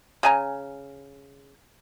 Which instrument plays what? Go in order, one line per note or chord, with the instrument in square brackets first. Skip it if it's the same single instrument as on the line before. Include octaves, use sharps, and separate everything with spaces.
[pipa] C#3 G#5 A#5